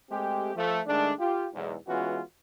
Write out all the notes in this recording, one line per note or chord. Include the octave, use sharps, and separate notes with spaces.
G#3 A3 C4 G4
F3 A3
D#3 G#3 A3 D4
F4 G4
B1 E2 G#2
E3 G#3 B3 C#4 F4 F#4